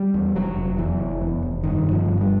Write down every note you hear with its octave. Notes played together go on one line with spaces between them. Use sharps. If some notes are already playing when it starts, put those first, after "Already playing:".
Already playing: G3
E2
F1 F#3
F1
E2 E3
F1
E2
F1
G2 D#3
G1
F3
G2
G3